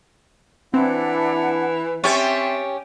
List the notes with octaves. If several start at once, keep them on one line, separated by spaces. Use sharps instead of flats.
E3 C4 D4 E4 F#5
C4 C#4 G4 E5 C#6 A6